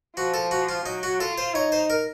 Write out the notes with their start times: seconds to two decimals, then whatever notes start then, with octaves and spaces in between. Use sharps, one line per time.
0.17 F3 F#4
0.34 A4
0.51 F#4
0.69 F4
0.85 F#3 D#4
1.03 F#4
1.20 F4 A4
1.38 C5
1.54 D#4 C#5
1.72 C5
1.90 A#4